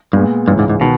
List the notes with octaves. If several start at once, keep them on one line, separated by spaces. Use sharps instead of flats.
G2 A#2 G#3 B3
C#2 G2 C#3 E3
G#2
G#2
B2 D#3